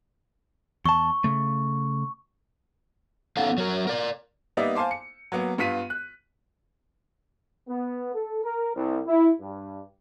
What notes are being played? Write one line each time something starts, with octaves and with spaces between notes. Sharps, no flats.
E2 A5 C#6
C#3 A3
B3 C#4 D#4 A4 F5 F#5
F#3 A#4
A#4 D5
G3 A#3 B3 D#4 D5 E5
C5 F5 G#5 A5 C6 D6
C#7
F#3 A#3 B3
G2 B3 F4 B6 D#7
F#6
B3
A4
A#4
C2
E4
G2